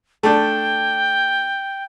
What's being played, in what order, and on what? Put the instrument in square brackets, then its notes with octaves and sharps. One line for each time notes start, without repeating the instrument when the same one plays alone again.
[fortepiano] A3 D4 [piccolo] G5